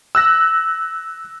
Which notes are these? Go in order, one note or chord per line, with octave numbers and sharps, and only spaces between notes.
E6 F#6 A#6